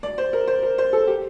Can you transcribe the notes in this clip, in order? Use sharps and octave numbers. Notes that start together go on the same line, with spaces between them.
D5
C5
A#4
C5
A#4
C5
A4
G4